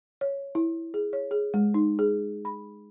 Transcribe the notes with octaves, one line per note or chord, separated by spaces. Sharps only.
C#5
E4
G#4
C#5
G#4
G#3
D#4
G#4
B5